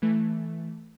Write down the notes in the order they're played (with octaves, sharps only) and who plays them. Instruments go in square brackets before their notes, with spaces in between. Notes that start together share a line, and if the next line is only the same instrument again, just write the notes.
[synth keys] E3 A3